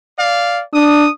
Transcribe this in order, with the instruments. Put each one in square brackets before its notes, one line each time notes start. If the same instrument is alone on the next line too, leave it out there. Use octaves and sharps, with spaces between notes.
[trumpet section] D5 F5
[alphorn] D4 [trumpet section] D#6